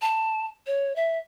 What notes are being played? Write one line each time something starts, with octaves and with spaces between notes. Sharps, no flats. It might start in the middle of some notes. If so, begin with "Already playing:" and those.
A5
C#5
E5